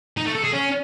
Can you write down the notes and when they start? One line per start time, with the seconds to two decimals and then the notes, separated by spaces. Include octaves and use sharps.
0.17 D#4
0.26 A3
0.35 A4
0.44 G#4
0.53 C#4